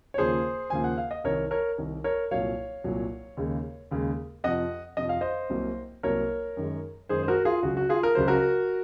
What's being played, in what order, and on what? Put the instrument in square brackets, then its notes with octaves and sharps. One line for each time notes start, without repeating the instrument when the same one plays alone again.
[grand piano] C#5
D#2 C#3 F3 A#3 G#4 C5
D#2 C#3 F3 A#3 G#5
F#5
F5
D#5
C2 C3 D#3 A#4 C#5
A#4 C#5
C2 C3 D#3
A#4 C#5
C2 A#2 F#3 C#5 F5
C2 A#2 F#3
D#2 C#3 G#3
D#2 C#3 G#3
F2 C3 F3 D#5 F#5
F2 C3 F3 D#5
F5
C5 D#5
C2 C3 F#3 A#3
C2 C3 F#3 A#3 A#4 C#5
F#2 D#3 G#3
F#2 D#3 G#3 G#4 C5
C5
F#4 A#4
F4 G#4
C#2 C#3 F#3 F#4
F#4
F4 G#4
A#4
C#2 C#3 F#3 C5
F#4 A#4